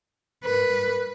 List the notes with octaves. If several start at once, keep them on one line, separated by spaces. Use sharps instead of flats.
A#4 B4